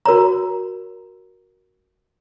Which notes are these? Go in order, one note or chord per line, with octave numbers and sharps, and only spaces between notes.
F#4 A#4 C#5 A#5